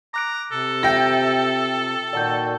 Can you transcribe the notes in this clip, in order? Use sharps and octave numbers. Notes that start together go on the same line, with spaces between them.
A#5 D6 F#6 D7
C3 A4
F4 E5 G5 A#6
A#2 D#3 F#4 D5 A5 G6